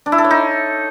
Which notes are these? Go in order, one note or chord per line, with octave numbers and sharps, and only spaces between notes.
D4
E4
A4
C#5
D#4